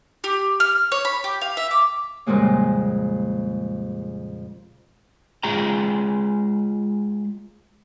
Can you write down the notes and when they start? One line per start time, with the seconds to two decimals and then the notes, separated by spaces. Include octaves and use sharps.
0.24 G4
0.60 F6
0.92 C#5
1.05 B5
1.24 G4
1.41 F5
1.57 E5
1.71 D6
2.26 F2 A#2 C#3 G3 G#3 A#3
5.43 G#3 F4 G#4 G5 A#5